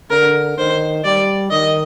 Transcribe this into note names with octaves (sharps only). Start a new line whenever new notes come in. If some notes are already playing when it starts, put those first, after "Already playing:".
D3 A#4
D#3 C5
G3 D5
D#3 D#5